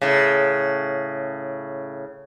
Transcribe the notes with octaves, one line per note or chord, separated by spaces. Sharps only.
A2 C#3